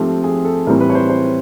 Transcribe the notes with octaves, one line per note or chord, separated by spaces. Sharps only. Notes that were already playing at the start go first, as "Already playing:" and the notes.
Already playing: G#2 F3 A3 C4 G4
G#4
A4
A2 E3 G3 C4 A#4
B4
C#5
C5
C5